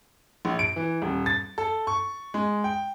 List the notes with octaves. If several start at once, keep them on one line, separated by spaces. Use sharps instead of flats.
A#1
D7
E3
D#1
A6
A4
C#6
G#3
G5